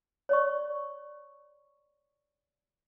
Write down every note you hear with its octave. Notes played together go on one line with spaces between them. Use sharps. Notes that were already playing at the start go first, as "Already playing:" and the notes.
C#5 D5 C#6